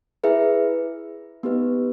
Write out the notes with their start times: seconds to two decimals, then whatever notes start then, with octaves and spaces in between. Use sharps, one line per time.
0.24 E4 G#4 B4 E5
1.43 B3 D#4 G4 B4 D#5